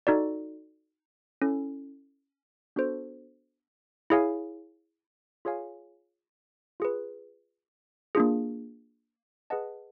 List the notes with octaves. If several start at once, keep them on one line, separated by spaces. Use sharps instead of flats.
D#4 F#4 A4 D5
C#4 E4 A4
B3 D4 F#4 A4 C5
E4 G#4 C#5 F5 G#5
F4 G#4 C#5 F5 G#5
F4 G#4 B4
A#3 D4 F4 G#4
G#4 B4 D#5 F#5 A5